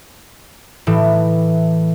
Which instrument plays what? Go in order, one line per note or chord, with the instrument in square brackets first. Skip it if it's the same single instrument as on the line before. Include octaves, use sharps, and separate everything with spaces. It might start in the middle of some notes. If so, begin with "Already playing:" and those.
[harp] A2 E3